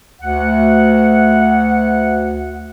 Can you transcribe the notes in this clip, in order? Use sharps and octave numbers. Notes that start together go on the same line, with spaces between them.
D2 F#5